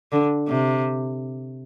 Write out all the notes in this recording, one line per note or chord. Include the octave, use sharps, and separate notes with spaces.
D3
C3